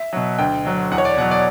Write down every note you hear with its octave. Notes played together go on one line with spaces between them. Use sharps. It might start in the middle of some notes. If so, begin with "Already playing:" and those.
Already playing: E5
B2 F#3
D2 G5
D3 F#3
E2 F#5
C#5
D5
B2 F#3 F#5
D5